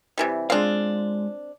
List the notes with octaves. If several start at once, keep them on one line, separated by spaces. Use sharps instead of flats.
C3 E3 G3
G#3 C4 D4 F4 F5